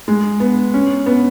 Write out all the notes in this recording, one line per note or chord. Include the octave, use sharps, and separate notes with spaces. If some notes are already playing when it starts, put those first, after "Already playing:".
G#3
B3
C#4
B3